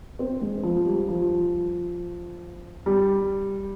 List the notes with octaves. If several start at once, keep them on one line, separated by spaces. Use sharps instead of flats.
C4
G#3
F3
G3
F3
G3